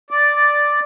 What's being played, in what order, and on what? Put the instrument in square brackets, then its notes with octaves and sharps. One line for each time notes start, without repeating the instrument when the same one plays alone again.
[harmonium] D5